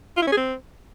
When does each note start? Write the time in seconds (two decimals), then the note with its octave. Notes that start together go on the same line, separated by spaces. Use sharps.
0.17 F4
0.22 E4
0.27 C#4
0.32 G#4
0.37 C4